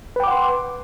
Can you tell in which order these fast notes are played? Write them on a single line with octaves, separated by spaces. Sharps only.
B4 G5 D6 F#5 C6